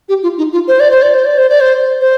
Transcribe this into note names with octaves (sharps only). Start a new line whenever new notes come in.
G4
F4
D#4
F4
C5
D5
C5
D5
C5
D5
C5
D5
C5
C5